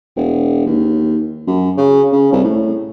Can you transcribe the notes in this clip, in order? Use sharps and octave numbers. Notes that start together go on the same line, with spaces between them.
E1
D#2
F#2
C#3
C#3
C2
A2